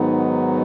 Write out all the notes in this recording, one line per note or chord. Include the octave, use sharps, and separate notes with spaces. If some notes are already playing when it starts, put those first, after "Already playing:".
Already playing: G#2 D#3 F#3 B3 D#4